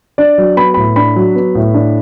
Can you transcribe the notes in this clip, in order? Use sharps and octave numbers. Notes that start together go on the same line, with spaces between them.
D4 D5
F#3
B3 B5
A2 B5
D4 B5
F#3
B3
A2
D4